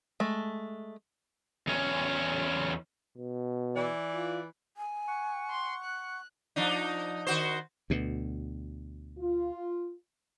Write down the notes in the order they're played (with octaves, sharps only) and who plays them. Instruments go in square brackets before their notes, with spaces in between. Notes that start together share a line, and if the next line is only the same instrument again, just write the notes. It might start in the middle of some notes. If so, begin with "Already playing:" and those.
[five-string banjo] G#3 A3
[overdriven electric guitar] E2 C#4
[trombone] B2
[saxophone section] E3 D5
[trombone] F4
[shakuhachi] G#5
[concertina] F#5 C#6
[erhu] C6
F#6
[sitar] F3 D4 D#4
D#3 F#4 C5
[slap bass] D2 B2
[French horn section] F4